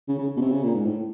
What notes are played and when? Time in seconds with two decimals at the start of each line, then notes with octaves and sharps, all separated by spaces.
0.08 C#3
0.18 C#3
0.36 B2
0.41 C3
0.52 C#3
0.64 A#2
0.74 G#2
0.85 A2